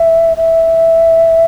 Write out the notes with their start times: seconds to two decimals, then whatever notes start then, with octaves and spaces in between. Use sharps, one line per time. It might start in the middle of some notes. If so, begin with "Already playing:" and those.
Already playing: E5
0.37 E5